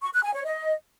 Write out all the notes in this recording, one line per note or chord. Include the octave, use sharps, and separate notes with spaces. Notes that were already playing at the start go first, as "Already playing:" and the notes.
C#6
F#6
G#5
C#5
D#5